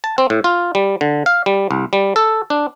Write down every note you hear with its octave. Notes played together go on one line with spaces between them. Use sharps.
A5
C4
A2
F4
G3
D3
F5
G3
C2
G3
A4
D4